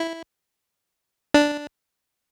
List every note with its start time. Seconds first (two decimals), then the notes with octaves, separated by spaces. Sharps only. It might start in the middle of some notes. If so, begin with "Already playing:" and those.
Already playing: E4
1.34 D4